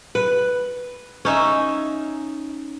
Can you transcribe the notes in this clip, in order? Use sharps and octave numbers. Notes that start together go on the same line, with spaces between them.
B4
C#4 D#4 E5